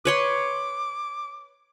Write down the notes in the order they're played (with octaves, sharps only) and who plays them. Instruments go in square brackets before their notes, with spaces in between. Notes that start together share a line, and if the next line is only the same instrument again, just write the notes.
[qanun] B4 C#5 C6 [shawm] D6